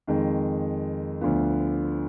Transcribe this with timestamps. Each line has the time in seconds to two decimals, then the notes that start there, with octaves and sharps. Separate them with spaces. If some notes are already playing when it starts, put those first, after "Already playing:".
0.07 F2 D#3 G#3
1.21 D2 D3 F3 B3